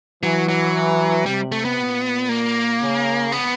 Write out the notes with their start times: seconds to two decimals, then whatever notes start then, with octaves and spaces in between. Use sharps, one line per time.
0.23 E3 F#3
0.49 F#3
1.26 C3 G3
1.52 A3
1.65 B3
1.78 A#2
2.29 A#3
2.81 C#3
3.32 B3